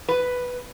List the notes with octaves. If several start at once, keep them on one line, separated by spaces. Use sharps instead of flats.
B4